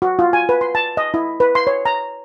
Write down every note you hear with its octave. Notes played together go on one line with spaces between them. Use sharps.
F#4
F4
G#5
B4
C6
A5
D#5
E4
B4
C6
C#5
A#5